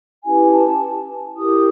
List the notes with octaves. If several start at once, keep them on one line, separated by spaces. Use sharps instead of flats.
C#4 E4 G4 B4 G#5
A5
E4 G4 A#4 D#6